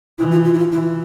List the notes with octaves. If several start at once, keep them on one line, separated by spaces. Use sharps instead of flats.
E3 E4
F4
F4
E4
F4
E3 E4